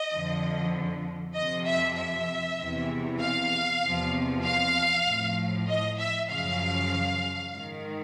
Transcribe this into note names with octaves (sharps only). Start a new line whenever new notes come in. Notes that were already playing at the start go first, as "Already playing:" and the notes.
Already playing: D#5
F2 D3 F3
F2 C3 F3 D#5
E5
E5
E2 C3 E3
F5
E2 C3 F3
F5
A2 F3
D#5
E5
F#2 C#3 F3 F5
G#2 D#3